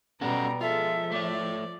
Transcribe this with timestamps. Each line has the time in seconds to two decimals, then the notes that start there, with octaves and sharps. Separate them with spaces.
0.21 B2 G3 C#4 A4 F#5 A#5
0.61 F3 G#3 F4 A4 E5
1.12 A3 C#5 D5